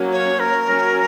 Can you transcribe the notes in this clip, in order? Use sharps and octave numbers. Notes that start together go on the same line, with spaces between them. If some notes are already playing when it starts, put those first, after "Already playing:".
Already playing: F#3 A#3 C#4
C#5
A#4
F#3 C#4 F#4